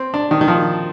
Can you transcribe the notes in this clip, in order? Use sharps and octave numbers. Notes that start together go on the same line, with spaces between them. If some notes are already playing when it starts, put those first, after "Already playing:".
Already playing: C4
D4
D#3
D#3
F3